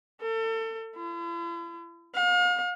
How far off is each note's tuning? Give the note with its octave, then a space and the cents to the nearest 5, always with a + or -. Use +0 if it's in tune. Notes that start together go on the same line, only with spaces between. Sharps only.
A4 +35
E4 +45
F5 +40